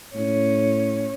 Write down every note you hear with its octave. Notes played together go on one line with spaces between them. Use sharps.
A2 C#4